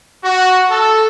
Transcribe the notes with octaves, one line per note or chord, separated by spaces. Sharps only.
F#4
A4